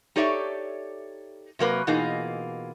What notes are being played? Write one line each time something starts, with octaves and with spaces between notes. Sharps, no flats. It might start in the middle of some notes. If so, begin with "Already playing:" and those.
D#4 G4 A4 C#5 D5 E5
C3 F#3 A#3 B4
B2 E3 A#3 D#4 F4 G#4